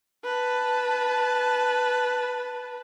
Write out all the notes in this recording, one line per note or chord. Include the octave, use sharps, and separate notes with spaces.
B4 A5